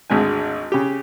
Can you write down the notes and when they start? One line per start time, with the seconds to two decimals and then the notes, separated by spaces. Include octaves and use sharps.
0.10 G#1 D2 G#3 G#5
0.72 C#3 G4